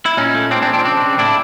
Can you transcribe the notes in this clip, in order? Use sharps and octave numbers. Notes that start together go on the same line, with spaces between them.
E4
A#2 C#4 D#4
A3
G#3 C4 D4
C4 D4
F3
C4 D4
C#3 C4 D4
C#3
A2 D4 E4